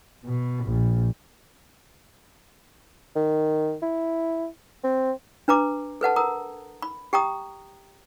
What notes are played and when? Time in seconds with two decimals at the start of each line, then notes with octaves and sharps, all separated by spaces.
0.24 B2
0.64 A#1
3.16 D#3
3.82 E4
4.84 C4
5.48 D4 B4 A#5 D6
6.01 A4 B4 F#5 A5
6.16 A#4 A#5 D#6
6.82 B5
7.13 G4 G5 A#5 D#6